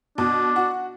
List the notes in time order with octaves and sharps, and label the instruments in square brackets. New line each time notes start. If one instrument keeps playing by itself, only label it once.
[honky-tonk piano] B2 [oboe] D4
[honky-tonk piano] F#4